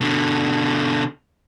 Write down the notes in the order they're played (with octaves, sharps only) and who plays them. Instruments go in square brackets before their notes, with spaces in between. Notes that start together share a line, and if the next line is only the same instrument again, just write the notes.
[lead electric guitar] B2 D3